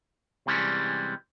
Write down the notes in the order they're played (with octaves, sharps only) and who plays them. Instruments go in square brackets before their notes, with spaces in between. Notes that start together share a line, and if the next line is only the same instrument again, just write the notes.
[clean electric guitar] C3 E3 G3 G#3 C#4